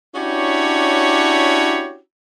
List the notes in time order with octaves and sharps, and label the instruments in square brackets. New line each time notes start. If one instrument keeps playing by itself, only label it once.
[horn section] C#4 D4 E4 F#4 G4 C#5